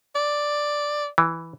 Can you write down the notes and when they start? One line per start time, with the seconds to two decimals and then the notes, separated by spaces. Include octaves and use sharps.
0.15 D5
1.18 E3